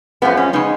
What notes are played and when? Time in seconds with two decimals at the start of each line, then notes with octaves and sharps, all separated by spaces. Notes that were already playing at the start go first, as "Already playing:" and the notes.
0.22 F#2 F3 G#3 B3
0.37 C#4
0.53 C#3 G#3 D#4